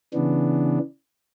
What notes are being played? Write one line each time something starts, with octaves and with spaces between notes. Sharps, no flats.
C#3 E3 B3 D4